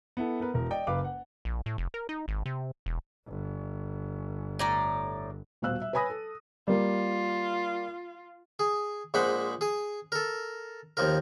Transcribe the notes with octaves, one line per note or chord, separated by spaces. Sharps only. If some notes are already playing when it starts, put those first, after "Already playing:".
B3 E4 A4
B3 A#4 B4
E1 A#4
D5 D#5 G5
F#1 B4 F5 D6
F#5
A#1
A2
F1
A#4
D#4
G#1
C3
E1
G1
A2 D5 A#5
D#1 B2 C5 F5 E6 F#6
E5
B4 C#5 G#5 B5 D#6 A#6
A4
G3 A#3 F4
G#4
A#1 G#3 C5 F#5 B5
G#4 D#6
A4 A#4
D#2 F3 A#4